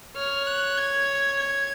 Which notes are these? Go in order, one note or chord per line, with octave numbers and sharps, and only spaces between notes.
C#5 F6
F#6
G#6
G#6